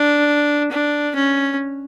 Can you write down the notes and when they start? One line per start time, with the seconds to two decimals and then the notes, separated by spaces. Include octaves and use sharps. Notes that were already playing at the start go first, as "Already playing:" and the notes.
Already playing: D4
0.71 D4
1.15 C#4